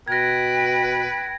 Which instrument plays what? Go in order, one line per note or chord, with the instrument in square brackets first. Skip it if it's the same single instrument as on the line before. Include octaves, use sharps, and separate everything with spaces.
[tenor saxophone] B2 [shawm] B4 [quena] G5 [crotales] G#6 A#6